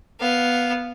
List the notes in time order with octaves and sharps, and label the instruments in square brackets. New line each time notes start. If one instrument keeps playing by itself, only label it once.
[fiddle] B3 F5